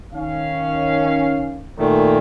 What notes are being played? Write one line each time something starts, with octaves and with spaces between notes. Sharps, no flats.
D#3 C#4 F5
A#2 D#3 A3